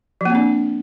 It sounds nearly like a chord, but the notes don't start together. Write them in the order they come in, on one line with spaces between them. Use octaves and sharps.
F3 A#3 C4 D4